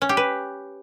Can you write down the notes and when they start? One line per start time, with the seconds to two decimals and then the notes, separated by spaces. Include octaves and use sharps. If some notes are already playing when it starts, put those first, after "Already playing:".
0.02 C#4
0.09 G4
0.17 B4